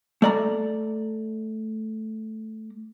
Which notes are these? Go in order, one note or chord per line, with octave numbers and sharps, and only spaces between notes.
A3 D5 A#5